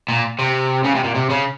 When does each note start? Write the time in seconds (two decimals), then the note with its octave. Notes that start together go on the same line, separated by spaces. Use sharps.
0.08 A#2
0.39 C3
0.84 C#3
0.95 C3
1.04 A#2
1.15 C3
1.30 C#3